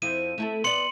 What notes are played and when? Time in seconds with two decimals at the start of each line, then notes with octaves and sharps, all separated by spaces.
0.02 F2 C4 E4 D#7
0.38 A3 E4 A4
0.64 B3 D5 C6 C#7 F#7